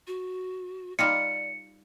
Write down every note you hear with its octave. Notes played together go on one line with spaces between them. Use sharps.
F#4
G3 D#4 F4 D5 C#7